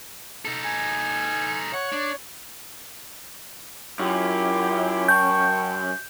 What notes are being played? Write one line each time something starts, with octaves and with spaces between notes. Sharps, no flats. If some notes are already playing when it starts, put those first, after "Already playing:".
D#4 A4
G#5
C#5 F#5
D4
F#2 E4 F4 G4
G5 A5 C#6 G6